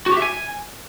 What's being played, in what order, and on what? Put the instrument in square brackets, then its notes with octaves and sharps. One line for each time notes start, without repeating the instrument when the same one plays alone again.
[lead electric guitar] F#4
G4
E5
G#5